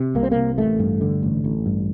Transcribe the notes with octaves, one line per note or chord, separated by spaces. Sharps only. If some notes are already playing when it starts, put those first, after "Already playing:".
Already playing: C3
C2 A#3
C4
C3 A#3
A1 A3
G2
D3
A1
A1
G2